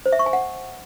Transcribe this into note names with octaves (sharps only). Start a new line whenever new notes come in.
C5
E5
C#6
G#5
F#5